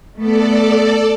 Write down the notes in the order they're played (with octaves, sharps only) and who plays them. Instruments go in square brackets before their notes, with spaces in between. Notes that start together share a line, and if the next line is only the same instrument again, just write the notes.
[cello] A3 B3 [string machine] A4 D5